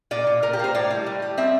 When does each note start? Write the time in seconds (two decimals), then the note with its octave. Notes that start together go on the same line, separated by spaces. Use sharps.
0.11 A#2 D5
0.27 A#2
0.42 A#2 A#4
0.53 G4
0.59 A#3 C5
0.74 A2 D5
0.90 G3
1.06 A2
1.22 G3
1.38 C4 E5